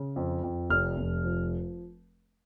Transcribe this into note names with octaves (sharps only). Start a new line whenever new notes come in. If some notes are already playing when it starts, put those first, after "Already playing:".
Already playing: C#3
F2
F2
F1 F6
F1
F3